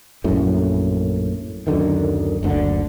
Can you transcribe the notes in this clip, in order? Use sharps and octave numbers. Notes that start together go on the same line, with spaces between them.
A#1 F#2 A2
D1 F#2 D3 D#3
F#1 D2 B2 D3